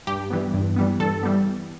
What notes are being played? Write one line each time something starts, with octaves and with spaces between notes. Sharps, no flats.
G2 G4
E3 G3 B3
G2
E3 G3 B3
G2 A4
E3 G3 B3